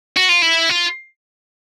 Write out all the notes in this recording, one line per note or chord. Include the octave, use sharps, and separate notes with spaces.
F#4
F4
E4
F4